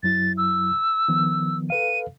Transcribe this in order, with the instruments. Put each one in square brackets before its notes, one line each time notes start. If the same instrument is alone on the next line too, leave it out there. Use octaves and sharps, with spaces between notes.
[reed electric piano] F#2 F#3 E4 [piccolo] A6
[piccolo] E6
[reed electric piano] D#3 F3 B3
[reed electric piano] A4 B4 F5 [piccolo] D#7